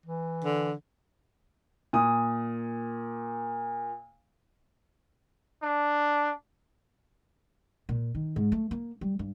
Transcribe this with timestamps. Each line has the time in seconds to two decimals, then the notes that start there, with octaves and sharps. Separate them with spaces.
0.06 E3
0.45 D3
1.93 A#2 D#6
5.63 D4
7.89 A#2
8.15 D#3
8.36 G#2
8.52 A3
8.71 A#3
9.01 G3
9.19 G2